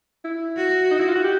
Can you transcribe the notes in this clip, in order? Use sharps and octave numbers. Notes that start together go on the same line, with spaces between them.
E4
F#4
D#4
E4
F4
F#4
G4